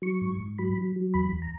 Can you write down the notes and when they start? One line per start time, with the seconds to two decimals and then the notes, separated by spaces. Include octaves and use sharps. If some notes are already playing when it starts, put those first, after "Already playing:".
0.02 F#3 C#6
0.21 G#2
0.40 G#2
0.58 F#3 B5
0.77 F#3
0.96 F#3
1.14 E2 B5
1.32 E2
1.42 A#5